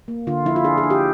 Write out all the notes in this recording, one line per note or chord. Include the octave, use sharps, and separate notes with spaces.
A#3
D3 F4
F3 E4
F4
D4 G#4
G#4
D4
G4